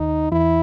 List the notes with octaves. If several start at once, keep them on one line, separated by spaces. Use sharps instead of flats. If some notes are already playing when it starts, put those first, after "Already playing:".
Already playing: D#2 D#3 D#4
E2 E3 E4